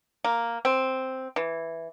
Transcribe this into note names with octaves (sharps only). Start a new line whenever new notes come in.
A#3
C4
E3